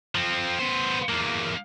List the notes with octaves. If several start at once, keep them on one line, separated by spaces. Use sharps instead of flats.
F3 C4
B3 C5
E2 A#3